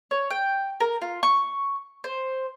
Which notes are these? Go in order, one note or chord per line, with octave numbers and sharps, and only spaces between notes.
C#5
G5
A#4
F4
C#6
C5